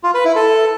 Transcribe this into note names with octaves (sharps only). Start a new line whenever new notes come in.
F4
B4
E4
A4